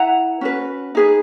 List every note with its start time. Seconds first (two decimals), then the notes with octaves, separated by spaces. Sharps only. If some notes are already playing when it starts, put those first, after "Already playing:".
Already playing: E4 B4 F#5 A#5
0.41 C#4 F#4 B4
0.95 D#4 G#4 B4